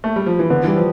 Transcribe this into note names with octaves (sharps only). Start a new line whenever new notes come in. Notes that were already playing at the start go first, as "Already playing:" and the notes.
A3
G3
F3
E3
D3 B3
E3 G3
F3